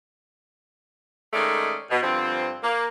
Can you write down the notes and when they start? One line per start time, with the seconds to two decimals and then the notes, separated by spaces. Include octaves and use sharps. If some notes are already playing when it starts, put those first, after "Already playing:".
1.33 D#3 G#3 A3 C#4 G#4 D5
1.91 B2
2.03 G2 D3 F3 C4
2.63 A#3